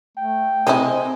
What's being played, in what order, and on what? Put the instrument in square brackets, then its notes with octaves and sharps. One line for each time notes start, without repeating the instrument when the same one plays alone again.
[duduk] A3 [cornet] G5
[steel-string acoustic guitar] C3 D#5 G#5 [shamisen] G#3 E4 [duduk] C4